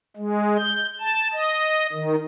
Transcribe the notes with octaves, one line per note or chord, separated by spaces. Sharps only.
G#3
G6
A5
D#5
D#3